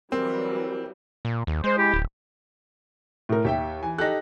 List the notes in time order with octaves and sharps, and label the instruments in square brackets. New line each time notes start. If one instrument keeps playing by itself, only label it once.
[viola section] E3 F#3 G3 [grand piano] C4 [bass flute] A#4
[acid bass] A#2
D#2
[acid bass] G#3 [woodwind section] C5
[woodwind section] E4 G4
[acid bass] D1
[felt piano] A2 A#4
[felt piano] D#2 [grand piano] G4 E5 G5
[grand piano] E3 G#5
[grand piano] D#4 G4 A4 [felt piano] F#6 A#6